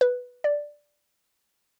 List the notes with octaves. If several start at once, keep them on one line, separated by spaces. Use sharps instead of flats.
B4
D5